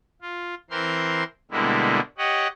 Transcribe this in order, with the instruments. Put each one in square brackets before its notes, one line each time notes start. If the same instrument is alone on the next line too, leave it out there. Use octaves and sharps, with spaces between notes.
[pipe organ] F4
E3 C4 A#4 C6
B2 D3 G3 G#3 A#3 E4
G4 C#5 D#5 F#5